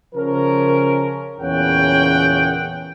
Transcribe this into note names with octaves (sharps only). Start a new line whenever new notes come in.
C#3 F3 C#4 A#4
E2 A#2 C#3 C#4 F#5 G5